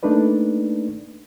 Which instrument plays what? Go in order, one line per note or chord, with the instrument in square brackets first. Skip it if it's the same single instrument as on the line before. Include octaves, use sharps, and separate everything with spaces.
[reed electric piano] A3 A#3 D4 D#4 B4 D5